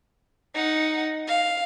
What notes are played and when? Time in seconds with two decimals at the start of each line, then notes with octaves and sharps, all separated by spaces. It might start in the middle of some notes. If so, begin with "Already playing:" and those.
0.54 D#4 F#5
1.28 F5